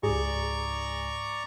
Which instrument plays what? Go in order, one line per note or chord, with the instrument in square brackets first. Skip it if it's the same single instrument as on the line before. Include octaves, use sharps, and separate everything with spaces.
[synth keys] C#2 G#2 [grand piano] G#4 [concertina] D5 A#5 C#6